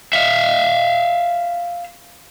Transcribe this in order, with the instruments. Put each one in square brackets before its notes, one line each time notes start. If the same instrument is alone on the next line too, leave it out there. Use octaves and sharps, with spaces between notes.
[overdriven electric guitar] E5 F5